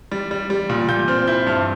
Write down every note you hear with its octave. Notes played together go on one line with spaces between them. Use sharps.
G3
G3
G3
A#2
A#2 G6
C4 F6
E4 G6
G2 F6